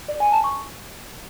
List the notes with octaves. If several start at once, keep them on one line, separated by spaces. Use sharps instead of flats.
D5
G#5
A5
C#6